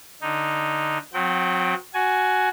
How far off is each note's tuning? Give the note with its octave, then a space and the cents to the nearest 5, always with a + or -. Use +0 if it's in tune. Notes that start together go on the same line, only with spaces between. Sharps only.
D3 +0 D#4 +0
F#3 -35 C4 +0 G5 -35
F#4 +0 G#5 +15